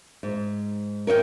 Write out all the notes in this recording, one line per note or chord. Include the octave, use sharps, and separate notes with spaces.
G#2
A#4 C#5 D#5 G5